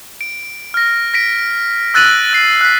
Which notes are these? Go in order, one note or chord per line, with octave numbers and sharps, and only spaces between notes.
D7
F6 A#6
A#6 B6 D7
E6 F#6 A6 D#7 F#7
F#6 C7
F#6 B6